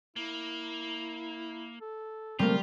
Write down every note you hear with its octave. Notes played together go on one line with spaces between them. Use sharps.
A#3 E4
A4
C3 F3 G3 A3 A#3 F4